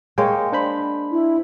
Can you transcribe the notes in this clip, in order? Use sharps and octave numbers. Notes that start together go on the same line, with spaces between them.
G#3 A#3 C#5 G5
D4 C5 B5
E4